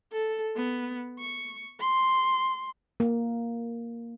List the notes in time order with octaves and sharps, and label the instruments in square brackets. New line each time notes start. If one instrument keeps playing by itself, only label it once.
[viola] A4
B3
C#6
C6
[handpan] A#3